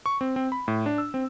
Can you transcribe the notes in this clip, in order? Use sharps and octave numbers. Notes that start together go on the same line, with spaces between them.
C#6
C4
C4
B5
A2
D4
E6
C4